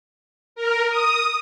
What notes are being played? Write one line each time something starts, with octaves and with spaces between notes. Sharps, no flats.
A#4
D#6